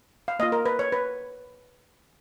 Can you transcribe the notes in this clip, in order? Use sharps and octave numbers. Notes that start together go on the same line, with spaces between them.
F5
A#3 F4 D#5
A#4
B4
C#5
B4